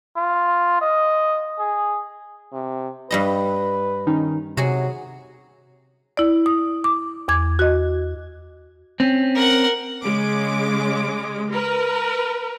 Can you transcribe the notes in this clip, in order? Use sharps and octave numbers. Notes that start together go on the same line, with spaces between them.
F4
D#5
G#4
C3
G2 G3 B4 D#5
D#3 C#4 D#4
C3 F#3 F#4 G#4
E4 D5
D#6
D6
E2 D6 G#6
F#4 D#5
C4 C#4
A#4 F#5
C#3 G#3 D6
A#4 B4